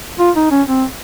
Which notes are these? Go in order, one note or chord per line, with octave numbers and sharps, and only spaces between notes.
F4
D#4
C#4
C4